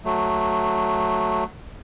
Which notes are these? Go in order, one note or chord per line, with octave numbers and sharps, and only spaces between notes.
F#3 A3